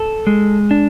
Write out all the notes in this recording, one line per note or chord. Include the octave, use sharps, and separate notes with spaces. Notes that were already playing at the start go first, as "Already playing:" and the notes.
Already playing: A4
G#3
D4